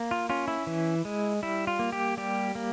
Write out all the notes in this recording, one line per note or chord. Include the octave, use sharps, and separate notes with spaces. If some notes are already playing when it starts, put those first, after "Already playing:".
Already playing: A#3
F4
C#4 F4
E4
E3
G#3
G3 E4
F4
A#3
G4
G3 G4
A#3